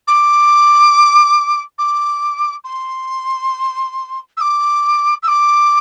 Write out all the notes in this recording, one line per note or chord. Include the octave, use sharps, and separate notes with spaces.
D6
D6
C6
E6
D6
E6
D6